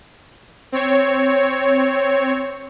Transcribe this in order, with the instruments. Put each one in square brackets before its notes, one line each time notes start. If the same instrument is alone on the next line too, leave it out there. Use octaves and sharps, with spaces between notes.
[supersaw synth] C4 C#5